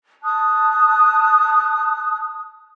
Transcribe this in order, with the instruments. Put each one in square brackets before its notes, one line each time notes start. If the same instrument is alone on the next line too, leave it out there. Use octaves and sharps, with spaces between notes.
[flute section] A5 D#6 F#6